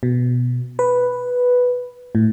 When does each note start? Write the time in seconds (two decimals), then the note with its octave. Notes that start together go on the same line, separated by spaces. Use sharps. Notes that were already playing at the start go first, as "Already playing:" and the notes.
0.03 B2
0.79 B4
2.15 A2